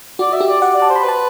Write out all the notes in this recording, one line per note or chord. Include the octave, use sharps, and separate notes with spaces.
F#4 D5
E5
G4
D5
D5 F#5
D5
A5
C5
B5
B4 A5